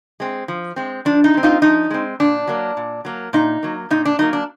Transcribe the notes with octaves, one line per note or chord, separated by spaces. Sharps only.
G#3 C4
F3
G#3 C4
F3 D4
D#4
G#3 C4
D#4 F4
F3 D#4
G#3 C4
A#2 D4
F#3 A#3
A#2
F#3 A#3
A#2 D#4
F#3 A#3
A#2 D#4
D4
F#3 A#3 D#4
D4